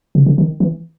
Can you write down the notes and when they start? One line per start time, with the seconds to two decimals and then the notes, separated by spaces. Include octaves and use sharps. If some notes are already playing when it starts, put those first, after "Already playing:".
0.15 C#3
0.26 D3
0.38 D#3
0.60 E3